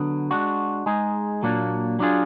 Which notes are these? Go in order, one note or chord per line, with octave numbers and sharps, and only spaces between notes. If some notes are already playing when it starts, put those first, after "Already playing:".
Already playing: D3 F#3 B3
G#3 D4 F#4
G#3 D#4 G#4
A#2 F#3 A#3 D4
F#3 D4 F4 G#4